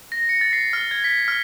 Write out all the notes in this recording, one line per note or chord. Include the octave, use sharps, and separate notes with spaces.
A#6
C#7
A6
C7
F6
G#6
B6
F6